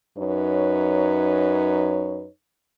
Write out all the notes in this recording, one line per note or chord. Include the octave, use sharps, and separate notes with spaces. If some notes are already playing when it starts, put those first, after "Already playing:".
F#2 D#4 B4 C#5